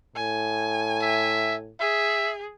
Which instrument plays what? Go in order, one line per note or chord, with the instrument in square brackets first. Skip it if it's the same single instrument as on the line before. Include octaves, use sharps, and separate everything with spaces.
[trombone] A2 [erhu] G#5
[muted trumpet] E5
[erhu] G#4 [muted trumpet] E5